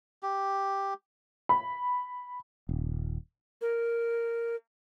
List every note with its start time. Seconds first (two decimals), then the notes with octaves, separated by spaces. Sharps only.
0.23 G4
1.49 B5
2.69 D#1
3.62 A#4